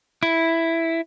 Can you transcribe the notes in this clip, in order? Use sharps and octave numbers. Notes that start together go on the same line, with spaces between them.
E4